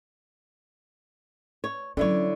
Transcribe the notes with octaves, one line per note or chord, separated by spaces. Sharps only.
C#5
D3 F#3 C#4 E4 C#5